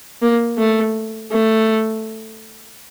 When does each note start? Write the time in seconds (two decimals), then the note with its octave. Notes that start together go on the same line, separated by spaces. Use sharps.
0.22 A#3
0.58 A3
1.32 A3